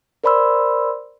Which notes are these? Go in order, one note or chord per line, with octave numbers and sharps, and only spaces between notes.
A#4 C5 D5 B5 C6 E6